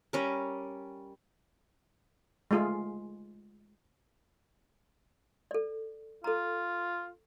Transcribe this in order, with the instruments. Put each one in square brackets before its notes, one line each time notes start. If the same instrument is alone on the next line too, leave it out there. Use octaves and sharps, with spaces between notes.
[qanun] G3 C#4 A#4
[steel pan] G#3 A3 F4 G#4
[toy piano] A4 D5
[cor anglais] F4 [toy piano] A4 A#5